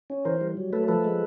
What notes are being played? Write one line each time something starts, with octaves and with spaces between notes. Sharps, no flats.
C#4
E3 A#4 C5
G3
F#3
A3 A4 B4
F3 A4 B4
G#3